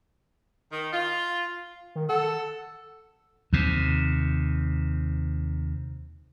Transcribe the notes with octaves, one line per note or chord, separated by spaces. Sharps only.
D#3
F4
D#3
A4 F#5
D#2 C3